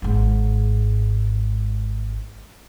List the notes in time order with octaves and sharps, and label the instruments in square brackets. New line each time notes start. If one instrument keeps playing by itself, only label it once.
[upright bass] G#1 G#2